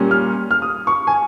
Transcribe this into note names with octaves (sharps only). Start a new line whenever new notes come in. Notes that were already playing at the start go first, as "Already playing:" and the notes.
Already playing: A#2 G3 A#3 C#4
F6
F6
D#6
C#6
G#5